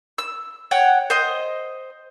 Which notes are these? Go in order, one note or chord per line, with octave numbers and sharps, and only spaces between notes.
E6
C#5 F#5 G5
C5 D#5